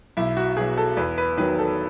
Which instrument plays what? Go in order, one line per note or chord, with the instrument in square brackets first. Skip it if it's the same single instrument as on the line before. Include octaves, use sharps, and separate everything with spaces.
[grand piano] B1 E4
F#4
B2 F#3 G#4
A4
E2 B4
B4
D#3 F#3 B4
A4